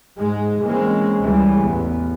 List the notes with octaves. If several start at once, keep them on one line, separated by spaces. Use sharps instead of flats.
G#2 G#3
E3 G#3 A#3 C4 C#4
C#2 C#3 E3 G3
A1 E2 B3